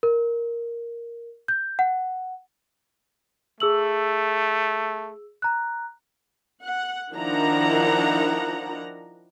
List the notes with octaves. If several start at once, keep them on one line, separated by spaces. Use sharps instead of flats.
A#4
G6
F#5
A3 G#4 E6 F#7
A#5 F#6
F#5
D#3 F3 D4 E4 F#5 A#5